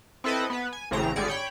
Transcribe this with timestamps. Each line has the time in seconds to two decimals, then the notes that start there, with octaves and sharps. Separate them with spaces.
0.24 C4 E4 A4 B4 D#5
0.50 B3 B4
0.73 G#5
0.91 A1 A2 C#3 C4 A#5
1.16 G#1 D3 G3 G#4 D5 C#7
1.28 C#5 G5 B5